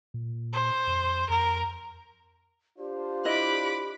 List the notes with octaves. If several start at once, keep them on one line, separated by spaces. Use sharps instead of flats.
A#2
C5
F2
F2 A#4
D4 F4 G4 C5
E4 D#5 B5 D6 F#6